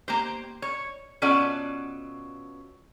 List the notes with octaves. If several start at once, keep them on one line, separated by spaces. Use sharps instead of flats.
A#3 G4 C5
C#5
B2 C#4 F4 A4 D5 F#5